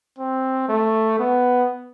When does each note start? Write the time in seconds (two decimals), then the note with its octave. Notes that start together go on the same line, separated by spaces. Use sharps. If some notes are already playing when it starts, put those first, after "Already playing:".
0.19 C4
0.69 A3
1.19 B3